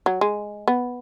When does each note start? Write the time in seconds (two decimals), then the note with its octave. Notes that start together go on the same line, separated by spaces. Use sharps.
0.06 F#3
0.21 G#3
0.68 B3